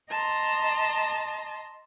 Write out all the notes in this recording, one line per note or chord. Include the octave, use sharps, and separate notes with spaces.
D#5 A5 A#5 C6